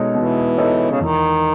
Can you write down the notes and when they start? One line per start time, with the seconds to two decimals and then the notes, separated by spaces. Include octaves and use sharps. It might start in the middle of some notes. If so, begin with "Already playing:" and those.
Already playing: B2 G#3 D#4 A4 C#5
0.14 B2 E3
0.58 G#3 D#4 A4 C#5
0.91 C#3
1.01 E2 D#3